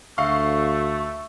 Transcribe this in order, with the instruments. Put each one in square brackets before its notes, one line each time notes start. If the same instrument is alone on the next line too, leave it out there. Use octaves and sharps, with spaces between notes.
[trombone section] D2 [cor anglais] A3 [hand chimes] E5 C#6 [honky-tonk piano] F5